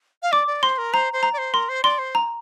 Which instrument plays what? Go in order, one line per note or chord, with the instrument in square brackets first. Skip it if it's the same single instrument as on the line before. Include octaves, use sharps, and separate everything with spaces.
[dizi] F5
[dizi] D5 [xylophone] D6
[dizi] D5
[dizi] C5 [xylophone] C6
[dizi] A#4
[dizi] C5 [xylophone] A#5
[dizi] C5
[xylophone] A#5
[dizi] D5
C5
[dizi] A#4 [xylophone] C6
[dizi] C5
[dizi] D5 [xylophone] C6
[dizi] C5
[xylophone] A#5